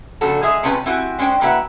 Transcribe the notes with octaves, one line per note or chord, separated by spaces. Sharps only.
A#2 C#3 F3 D4 F#4 A4
G#3 G#4 E5 G#5
C3 A3 C#4 F4 B4
C4 E4 F#4 G4 G#5
G#3 C#4 D4 C5 G5
A2 A#3 F#4 B4 E5 F#5